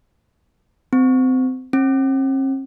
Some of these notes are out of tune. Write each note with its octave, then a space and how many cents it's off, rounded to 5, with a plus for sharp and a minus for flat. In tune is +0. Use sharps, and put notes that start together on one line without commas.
C4 -25
C4 +45